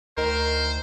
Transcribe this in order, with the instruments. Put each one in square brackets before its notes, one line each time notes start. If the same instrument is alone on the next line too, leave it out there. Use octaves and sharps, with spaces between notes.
[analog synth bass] D2 [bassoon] D#3 [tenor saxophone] A#4 [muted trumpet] C5